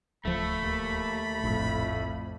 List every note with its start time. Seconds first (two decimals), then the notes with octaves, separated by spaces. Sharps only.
0.25 D1 C#2 F3 A3 B5
0.60 D#2
1.44 F1 A#1 F2 A2